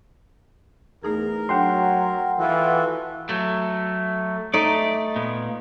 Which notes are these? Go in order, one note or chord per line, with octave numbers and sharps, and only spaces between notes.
E2 A3 D#4 G#4 A#4
F#3 A3 D4 F#5 G5 C6
E3 F4 F#4 A4
F#3 A3
A3 D#4 D5
A#2 B3